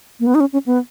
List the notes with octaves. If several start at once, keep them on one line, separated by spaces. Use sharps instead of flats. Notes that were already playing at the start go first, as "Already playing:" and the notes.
A#3
B3
D#4
C#4
C#4
B3